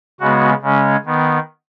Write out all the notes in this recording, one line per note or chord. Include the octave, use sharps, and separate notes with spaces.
C#3 G#3 B3 F#4
C#3 G#3 C#4
D#3 B3